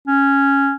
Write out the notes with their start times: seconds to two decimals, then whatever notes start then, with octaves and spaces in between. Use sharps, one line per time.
0.07 C#4